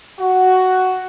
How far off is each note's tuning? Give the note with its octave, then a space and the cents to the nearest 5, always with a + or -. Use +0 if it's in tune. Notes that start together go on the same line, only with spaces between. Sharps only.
F#4 +5